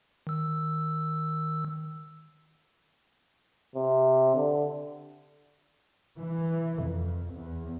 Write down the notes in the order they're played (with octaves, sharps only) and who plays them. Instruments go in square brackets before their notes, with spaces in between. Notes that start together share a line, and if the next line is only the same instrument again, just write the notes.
[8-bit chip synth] D#3 E6
[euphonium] C3
D3
[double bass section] E3
F2
E2